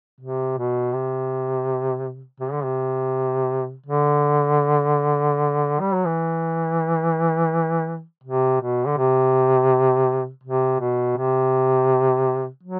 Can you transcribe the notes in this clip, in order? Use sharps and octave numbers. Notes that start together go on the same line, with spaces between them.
C3
B2
C3
C3
D3
C3
D3
G3
F#3
E3
C3
B2
D3
C3
C3
B2
C3
F#3